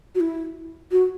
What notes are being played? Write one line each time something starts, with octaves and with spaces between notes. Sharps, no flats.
F#4
E4
F#4